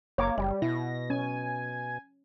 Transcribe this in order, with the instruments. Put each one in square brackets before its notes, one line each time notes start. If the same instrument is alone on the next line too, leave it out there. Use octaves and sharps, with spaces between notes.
[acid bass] F#1 [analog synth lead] A#3 [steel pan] C#5 D6
[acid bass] F#1 [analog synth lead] G3
[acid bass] B2 [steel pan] E4 [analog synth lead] A#6
[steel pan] C#4 [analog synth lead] G#5